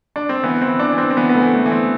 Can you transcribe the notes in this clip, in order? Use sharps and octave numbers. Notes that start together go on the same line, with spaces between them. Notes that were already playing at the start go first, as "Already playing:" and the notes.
D4
C4
E3 B3
C4
E3
D4
E3
C4
C4
E3 B3
B3
A3
E3
A3
E3
C4